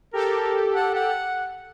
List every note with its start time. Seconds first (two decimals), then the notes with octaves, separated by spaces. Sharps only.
0.13 G4 A4 A#4
0.75 F#5
0.95 F#5